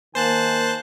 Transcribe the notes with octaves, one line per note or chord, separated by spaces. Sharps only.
D#3 A#3 C5 G#5 A5 F#6